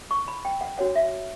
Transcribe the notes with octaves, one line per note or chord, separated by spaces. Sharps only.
C#6
B5
G5
F#5
D4 F#4 C#5 F#5
E5